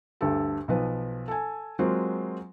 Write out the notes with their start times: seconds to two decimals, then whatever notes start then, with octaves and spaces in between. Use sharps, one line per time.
0.21 D2 G2 G4 A4
0.68 B1 F3 B4
1.28 A4 G#5
1.79 F#3 G#3 A#3 C4 F4 F#4